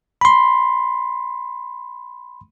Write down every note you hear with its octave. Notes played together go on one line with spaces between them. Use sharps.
B5 C6